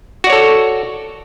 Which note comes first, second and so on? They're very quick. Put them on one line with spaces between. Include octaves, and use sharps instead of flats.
F#4 D5 C#5 A4